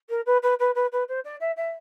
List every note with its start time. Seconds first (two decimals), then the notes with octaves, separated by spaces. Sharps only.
0.09 A#4
0.26 B4
0.42 B4
0.59 B4
0.75 B4
0.92 B4
1.08 C5
1.24 D5
1.40 E5
1.56 E5